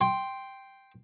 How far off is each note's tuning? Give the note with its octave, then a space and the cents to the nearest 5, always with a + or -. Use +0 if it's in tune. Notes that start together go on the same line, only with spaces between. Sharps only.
G5 +0 C6 +0